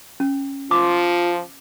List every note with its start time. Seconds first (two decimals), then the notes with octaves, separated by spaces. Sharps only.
0.20 C#4
0.71 F3 F4 D6